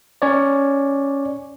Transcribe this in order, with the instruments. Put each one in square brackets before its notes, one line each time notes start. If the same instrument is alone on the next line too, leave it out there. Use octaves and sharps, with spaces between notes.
[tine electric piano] C#4 C#5 D5